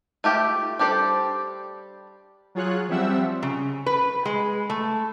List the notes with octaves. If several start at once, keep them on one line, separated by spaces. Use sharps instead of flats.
A3 F4 G4 E5 G5
G3 D4 G4 A4 C5
F#3 F4 G#4 C#5 F#6
F3 G3 C4 E5 F#5 E6
C#3
B4
G#3
A3